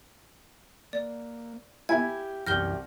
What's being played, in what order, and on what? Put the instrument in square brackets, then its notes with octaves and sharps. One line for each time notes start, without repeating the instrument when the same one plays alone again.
[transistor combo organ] A#3 [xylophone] D5
[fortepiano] E4 G#5 B5 [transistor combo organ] G4 [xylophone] G#6
[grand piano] C2 G4 A#6 [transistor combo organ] F#2 E3 [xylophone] F6 G6 G7